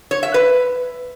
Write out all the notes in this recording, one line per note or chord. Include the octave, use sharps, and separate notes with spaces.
C#5
E5
B4